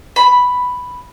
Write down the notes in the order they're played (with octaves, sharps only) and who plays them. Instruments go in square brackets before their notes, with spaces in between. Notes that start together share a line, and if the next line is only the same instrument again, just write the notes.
[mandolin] B5